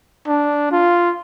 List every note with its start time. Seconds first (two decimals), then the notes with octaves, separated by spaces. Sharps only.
0.28 D4
0.72 F4